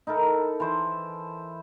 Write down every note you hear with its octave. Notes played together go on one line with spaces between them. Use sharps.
D#4 E4 A4 A#4
E3 C5 D6